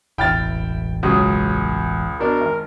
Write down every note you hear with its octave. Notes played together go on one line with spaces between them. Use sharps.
E1 A1 E4 G5 F6 A6
C#2 F#3 C#4 D#6
B2 D4 A#4
G#1